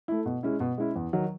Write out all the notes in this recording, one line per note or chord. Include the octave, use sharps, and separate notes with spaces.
A3 E4
B2
G#3 C#4 E4
B2
G#3 C#4 E4
E2
D#3 F#3